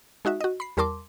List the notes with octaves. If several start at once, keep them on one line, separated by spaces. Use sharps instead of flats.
G#3 D#4 F#4 E5
F#4 D#5
B5 C7
E2 G3 A#4 A5 C6 D6